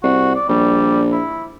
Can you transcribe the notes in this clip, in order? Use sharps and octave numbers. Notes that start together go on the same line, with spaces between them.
C2 F#4
D5
A#1 G3
E4